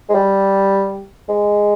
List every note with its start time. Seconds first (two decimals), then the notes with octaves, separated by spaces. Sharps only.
0.09 G#3
0.15 G3
1.29 G#3